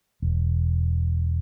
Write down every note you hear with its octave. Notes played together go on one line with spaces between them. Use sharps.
E1